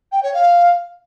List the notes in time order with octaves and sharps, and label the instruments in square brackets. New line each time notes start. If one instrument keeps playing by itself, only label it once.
[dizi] G5
C#5
F5